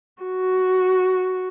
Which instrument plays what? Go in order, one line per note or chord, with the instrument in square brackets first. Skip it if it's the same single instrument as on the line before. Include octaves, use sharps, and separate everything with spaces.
[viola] F#4